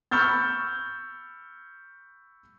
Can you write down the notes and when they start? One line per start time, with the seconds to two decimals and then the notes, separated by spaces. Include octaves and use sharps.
0.11 B5 C#6 E6 F6 G6 A6